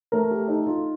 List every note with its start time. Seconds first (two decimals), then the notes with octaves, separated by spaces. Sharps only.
0.12 A3 A#4
0.31 G4
0.48 D#4 A4
0.66 F4